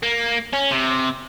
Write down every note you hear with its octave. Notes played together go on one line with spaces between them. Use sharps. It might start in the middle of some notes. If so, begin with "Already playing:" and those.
A#3
C#4
C3